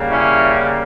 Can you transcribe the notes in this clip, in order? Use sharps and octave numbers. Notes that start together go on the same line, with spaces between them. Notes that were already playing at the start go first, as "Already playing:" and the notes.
Already playing: C#3 G3 A#3
C#4 E4